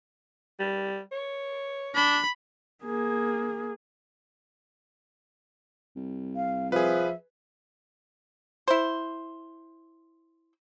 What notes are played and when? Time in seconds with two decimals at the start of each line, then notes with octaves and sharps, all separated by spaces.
0.60 G3
1.12 C#5
1.95 D4 B5
2.84 A#3 G#4
5.96 C2
6.35 F5
6.72 F3 G#4 B4 E5
8.68 E4 C5